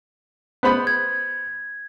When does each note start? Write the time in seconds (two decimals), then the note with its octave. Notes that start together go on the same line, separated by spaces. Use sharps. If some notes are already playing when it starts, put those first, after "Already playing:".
0.63 B3 C5 B5
0.87 G#6